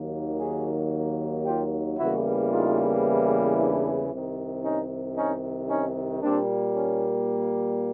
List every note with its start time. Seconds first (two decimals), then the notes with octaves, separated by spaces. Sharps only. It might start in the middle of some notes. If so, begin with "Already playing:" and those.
Already playing: D#2 D#3 F#3 A#3
0.39 F#4 G#4
1.45 F4 G4
1.98 E2 C#3 E3 G3 A#3 E4 F#4
2.51 D#4 F4
3.57 D4 E4
4.10 C2 C3 D#3
4.64 C#4 D#4
5.16 C#4 D#4
5.70 C#4 D#4
6.22 A#2 G3 A#3 C4 D4
6.76 C#4